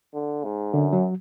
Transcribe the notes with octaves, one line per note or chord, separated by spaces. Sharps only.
D3
G#2
F#2 D3
F#3